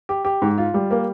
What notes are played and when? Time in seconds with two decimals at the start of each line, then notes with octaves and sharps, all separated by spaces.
0.09 G4
0.25 G4
0.42 G#2
0.58 F4
0.74 G3
0.91 A#3